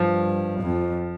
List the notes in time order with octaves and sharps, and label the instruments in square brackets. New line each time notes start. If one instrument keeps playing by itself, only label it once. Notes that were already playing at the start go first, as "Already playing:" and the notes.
Already playing: [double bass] G2 [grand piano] F3
[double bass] F2